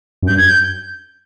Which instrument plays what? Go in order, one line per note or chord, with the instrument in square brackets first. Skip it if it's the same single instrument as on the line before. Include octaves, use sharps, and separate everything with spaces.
[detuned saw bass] F#2
[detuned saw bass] G2 [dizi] G6
[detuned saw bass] F#2 [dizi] G#6
[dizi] G6